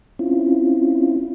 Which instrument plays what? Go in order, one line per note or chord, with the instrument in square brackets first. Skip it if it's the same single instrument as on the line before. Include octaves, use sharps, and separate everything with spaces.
[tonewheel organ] C4 C#4 E4 F4